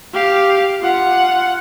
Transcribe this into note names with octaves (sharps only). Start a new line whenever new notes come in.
G4 F5
F4 F#5